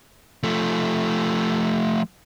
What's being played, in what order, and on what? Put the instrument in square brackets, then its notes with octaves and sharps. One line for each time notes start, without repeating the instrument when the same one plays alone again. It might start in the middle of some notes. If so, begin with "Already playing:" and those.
[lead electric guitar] F3 A3